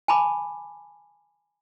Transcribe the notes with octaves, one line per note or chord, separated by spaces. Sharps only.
G#5 A5 B5 D6